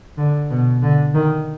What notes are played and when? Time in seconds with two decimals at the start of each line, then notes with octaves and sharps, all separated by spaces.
0.18 D3
0.51 B2
0.82 D3
1.14 D#3